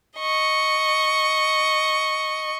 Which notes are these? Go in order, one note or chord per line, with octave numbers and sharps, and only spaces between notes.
D#5 C#6